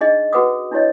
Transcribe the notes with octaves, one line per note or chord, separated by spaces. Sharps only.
D4 D#4 G#4 D#5
F#4 G#4 B4 F#5 D6 D#6
D4 E4 G4 C#5 D#5